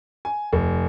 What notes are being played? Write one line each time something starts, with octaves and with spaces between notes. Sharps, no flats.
G#5
F1